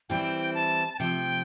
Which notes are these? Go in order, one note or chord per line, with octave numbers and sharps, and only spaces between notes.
E3 G3 C4 E4 G5
A5
A5
C3 F3 A3 G5